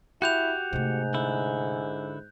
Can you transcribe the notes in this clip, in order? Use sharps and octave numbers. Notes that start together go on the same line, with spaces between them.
E4 F#4 G4 F#6 G6 F7
G#2 C3 A3
D3 E4